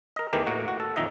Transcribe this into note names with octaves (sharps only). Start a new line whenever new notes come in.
A#4 D#5
E2 D#3 E3 A3 G4 A#4
A2 A#3 F#4
F#4
A4
F2 A#2 D#3 D#4 D#5 E5